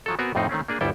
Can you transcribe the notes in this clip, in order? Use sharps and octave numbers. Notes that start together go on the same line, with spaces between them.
F3 F#3 A4
B3 C4 F#4 A#4 G#5
F2 A2 F3 C4 D#4
D#3 A3 C4 C#4
A#3 D4 G#4
G1 D2 G3 E4 A4 G5